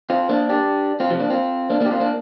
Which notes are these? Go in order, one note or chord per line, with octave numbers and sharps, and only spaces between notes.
C4 F4
A#3 D4
D4 G4
C4 F4
C3 F3
A#3 D4
C4 F4
A#3 D4
A#3 D4 G4
C4 F4
A#3 D4